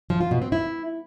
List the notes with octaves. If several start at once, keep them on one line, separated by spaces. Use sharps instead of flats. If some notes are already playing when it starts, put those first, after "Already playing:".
F3
F4
B2
C4
E4